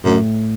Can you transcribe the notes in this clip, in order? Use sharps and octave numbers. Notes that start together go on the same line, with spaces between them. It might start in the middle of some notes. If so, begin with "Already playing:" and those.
F#2 A2